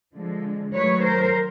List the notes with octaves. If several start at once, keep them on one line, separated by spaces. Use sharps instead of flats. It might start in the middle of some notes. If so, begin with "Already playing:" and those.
D3 F3 G#3
D#3 F#3 A3 B4 C#5
A#4 C5